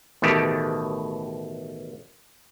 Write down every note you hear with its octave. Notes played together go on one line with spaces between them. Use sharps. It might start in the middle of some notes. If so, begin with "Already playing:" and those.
A1 B2 D#3 A3 G4